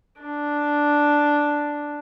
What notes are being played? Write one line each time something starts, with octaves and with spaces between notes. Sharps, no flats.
D4